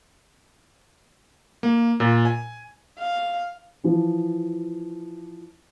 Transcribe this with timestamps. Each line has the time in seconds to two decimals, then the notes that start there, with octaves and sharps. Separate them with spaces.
1.63 A#3
2.00 A#2
2.25 G#5
2.98 F5
3.84 E3 F3